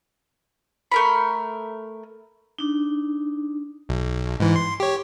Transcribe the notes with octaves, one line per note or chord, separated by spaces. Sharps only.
A3 A#4 B5
D4 D#4
B1
G#2 E3
C6
G4 C#5